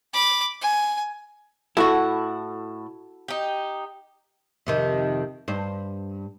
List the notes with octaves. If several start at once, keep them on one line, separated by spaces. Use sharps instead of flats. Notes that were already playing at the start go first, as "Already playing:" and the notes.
B5 D6
G#5
A2 E4 F#4 A4 F#5
D#4 G4
F2 C3 D#3
G2 C5